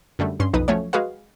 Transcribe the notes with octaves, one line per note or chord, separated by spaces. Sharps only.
F#2 D3 G3 A3
G2 C#4 C6
B1 F2 D#4 B4 D#6
F3 F#3 A3 C#4 C#5
G#3 F#4 G#4 B4 F5